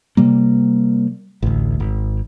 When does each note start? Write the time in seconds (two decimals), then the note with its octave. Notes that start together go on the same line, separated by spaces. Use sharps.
0.17 C3 G3 A#3
1.42 A1 D2
1.80 G#1